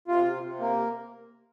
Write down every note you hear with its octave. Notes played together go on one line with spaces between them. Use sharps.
C3 F4
C3
C3
A#3